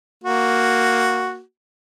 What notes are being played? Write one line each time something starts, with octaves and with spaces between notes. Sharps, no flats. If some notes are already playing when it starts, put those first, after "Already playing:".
A#3 F#4